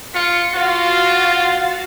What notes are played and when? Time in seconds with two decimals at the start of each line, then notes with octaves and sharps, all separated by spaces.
0.15 F4 C#7
0.55 F4 F#4 F5 A6